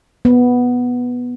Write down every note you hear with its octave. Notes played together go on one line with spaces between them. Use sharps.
B3